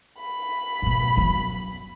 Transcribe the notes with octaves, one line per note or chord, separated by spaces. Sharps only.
B5
G#2 B2
F#2 B3